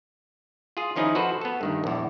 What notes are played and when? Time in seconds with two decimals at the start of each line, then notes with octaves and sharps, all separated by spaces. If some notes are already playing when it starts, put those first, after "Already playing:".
0.77 F4 G#4
0.96 D#3 F3 C#4 D#4 E4 G#4
1.15 F3 F#4 A4 B4 C5
1.41 B3 A4
1.61 G2 D#3 A3
1.84 A#1 E2